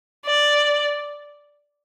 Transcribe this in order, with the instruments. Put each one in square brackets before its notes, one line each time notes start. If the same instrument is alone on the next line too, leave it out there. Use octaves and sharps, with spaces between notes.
[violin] D5